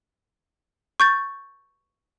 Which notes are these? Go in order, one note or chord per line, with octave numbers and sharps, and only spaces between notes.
C#6 G6 A6